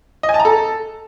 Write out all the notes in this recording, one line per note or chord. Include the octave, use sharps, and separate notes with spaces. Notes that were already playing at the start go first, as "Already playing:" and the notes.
D#5
G#5
A5
A#5
A4